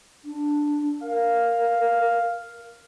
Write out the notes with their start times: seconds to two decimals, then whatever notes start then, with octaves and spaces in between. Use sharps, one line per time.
0.25 D4
1.02 A#4 F5